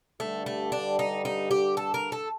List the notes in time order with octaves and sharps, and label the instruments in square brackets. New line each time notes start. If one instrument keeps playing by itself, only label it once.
[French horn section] G2 D3 G3 [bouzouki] A3
[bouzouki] A3
D4
D#4
D#4
G4
A4
A#4
A4